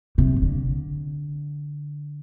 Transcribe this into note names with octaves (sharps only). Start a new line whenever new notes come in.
C3
D3